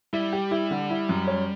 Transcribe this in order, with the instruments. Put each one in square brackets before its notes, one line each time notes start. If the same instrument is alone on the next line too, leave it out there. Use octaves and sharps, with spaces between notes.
[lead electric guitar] G3 [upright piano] E4
[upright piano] G4
E4
D3
E4
F#2
C#4